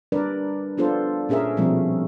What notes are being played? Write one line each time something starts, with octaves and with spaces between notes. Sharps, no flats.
G3 D4 A#4 B4 D5
B3 D4 F4 A4 C5
A#2 C#4 G#4 A#4 E5
B2 F3 G3 A3 C4